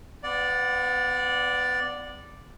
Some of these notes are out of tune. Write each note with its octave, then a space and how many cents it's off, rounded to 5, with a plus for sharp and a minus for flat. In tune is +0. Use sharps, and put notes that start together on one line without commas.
B3 +30 D5 +0 F#5 -35